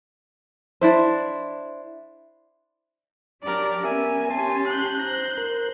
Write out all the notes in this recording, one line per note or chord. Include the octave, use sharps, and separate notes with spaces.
D4 E4 C5
F#3 D4 G4 A#4 D5
B3 C#4 A#4 E5 G#5
C#4 G4 A5 C6
F#6 G6
C5 A#5
A#4